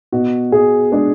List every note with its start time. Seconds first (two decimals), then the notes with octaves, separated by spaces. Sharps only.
0.12 B2 F#4
0.52 B2 G#4
0.92 G#3 D4